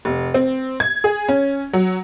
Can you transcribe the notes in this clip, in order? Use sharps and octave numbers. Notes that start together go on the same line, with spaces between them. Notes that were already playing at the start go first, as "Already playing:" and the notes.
F1
C4
G#6
G#4
C#4
F#3